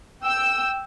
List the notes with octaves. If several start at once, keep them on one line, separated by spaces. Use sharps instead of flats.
G5 E6